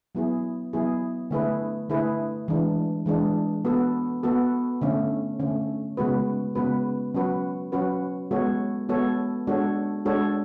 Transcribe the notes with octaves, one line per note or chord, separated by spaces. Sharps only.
F#3 B3 E4 G#4
F#3 B3 E4 G#4
D3 A3 E4 G#4 B4
D3 A3 E4 G#4 B4
E3 G#3 D4
E3 G#3 D4
B3 F#4 A4
B3 F#4 A4
D3 A3 C#4
D3 A3 C#4
C#3 G#3 B3 F#4 B4
C#3 G#3 B3 F#4 B4
F#3 C#4 F#4 B4
F#3 C#4 F#4 B4
G#3 B3 F#4 A4 C#5
G#3 B3 F#4 A4 C#5
G#3 D4 F#4 A4 C#5
G#3 D4 F#4 A4 C#5